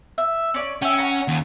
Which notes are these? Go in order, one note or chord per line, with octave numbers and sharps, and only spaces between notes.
E5
C#4 D5
C#4 E5 G5
F#5 A#5
D#2